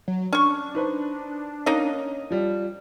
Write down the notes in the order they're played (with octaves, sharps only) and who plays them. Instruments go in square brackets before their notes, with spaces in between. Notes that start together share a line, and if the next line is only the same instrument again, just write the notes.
[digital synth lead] F#3
[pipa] C#4 C#6 [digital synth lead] D4
[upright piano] D#4 B4 C5
[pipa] A#3 D#4 D#5 [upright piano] C#4
[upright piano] F3 G3